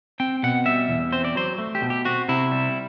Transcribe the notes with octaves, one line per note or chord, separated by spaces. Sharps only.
C4 G5
B2 F#5
G3 E5
E2
C4 C5
D5
F#3 C5
A3
G4
B2
G4
C4 F#4
C3 E4
G3